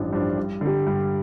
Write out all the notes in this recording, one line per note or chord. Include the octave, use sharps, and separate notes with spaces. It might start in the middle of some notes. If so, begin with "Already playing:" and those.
Already playing: A1 G2 F3 D4
G2 F3 D4
G2
D3 G3
G2